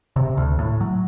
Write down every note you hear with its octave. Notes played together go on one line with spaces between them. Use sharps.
C3
D2
A2
F#3